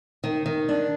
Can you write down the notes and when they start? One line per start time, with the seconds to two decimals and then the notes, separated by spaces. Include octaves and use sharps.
0.24 D#3
0.46 D#3
0.69 D4